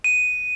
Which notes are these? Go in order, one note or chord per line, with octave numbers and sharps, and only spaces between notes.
D#7